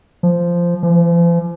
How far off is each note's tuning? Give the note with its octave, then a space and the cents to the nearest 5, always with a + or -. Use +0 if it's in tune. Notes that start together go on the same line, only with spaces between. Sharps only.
F3 -10
F3 -45